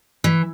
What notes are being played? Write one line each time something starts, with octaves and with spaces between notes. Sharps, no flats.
E3